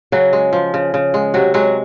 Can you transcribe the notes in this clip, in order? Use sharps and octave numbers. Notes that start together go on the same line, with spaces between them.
C#3 F#3 F#4
G#3
F3
C#3
C#3
G#3
C3 F#3 F#4
F#3 G#3 F#4